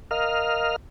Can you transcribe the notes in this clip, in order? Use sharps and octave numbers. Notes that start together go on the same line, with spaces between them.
A#4 D#5 F5 F6